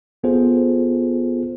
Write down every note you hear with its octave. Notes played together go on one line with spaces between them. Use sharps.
A1 B3 F4 G#4 A4 C5